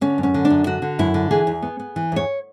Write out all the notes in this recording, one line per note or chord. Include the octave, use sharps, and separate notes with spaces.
D3 C#4
F#2
C#4
D3
D4
F#2
D3 F#4
D3
F#2 E4
D3
E3 G#4
E2
B3
B3
E3
E2 C#5